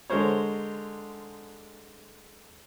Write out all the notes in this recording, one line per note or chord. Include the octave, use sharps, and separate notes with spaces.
D3 G#3 A#4 C5 C#5